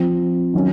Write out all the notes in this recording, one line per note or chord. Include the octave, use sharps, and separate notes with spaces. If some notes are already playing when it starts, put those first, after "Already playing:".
Already playing: F3 C4 F4
D#3 F#3 C#4